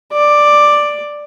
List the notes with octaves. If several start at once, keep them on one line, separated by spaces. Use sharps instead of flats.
D5